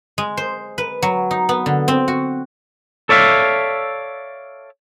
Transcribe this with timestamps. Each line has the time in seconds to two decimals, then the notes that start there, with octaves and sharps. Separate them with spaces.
0.18 G#3
0.37 C5
0.78 B4
1.02 F#3
1.31 D#4
1.49 B3
1.66 D3
1.88 C4
2.08 F#4
3.09 A4 C#5 D5 E5 F5